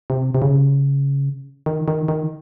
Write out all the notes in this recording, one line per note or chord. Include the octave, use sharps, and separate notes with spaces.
C3
C3
C#3
D#3
D#3
D#3